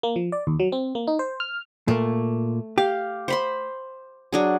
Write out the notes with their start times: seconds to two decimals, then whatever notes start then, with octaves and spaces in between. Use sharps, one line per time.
0.03 A#3
0.16 F3
0.32 D5
0.47 D#2
0.60 F#3
0.72 C4
0.95 A#3
1.07 D#4
1.19 C5
1.40 F6
1.88 A#2 A3 A#3
2.78 G4 F5
3.28 C5 B5 C6
4.33 F#3 D4 G#4